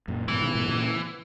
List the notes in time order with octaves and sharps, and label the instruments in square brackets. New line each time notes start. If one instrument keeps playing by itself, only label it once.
[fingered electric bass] F#2 A#2
[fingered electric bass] G#2 B2 [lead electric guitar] E3
[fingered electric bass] B2 D#3
G#2 B2
A#2 C#3